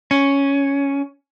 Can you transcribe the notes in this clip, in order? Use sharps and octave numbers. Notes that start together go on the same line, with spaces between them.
C#4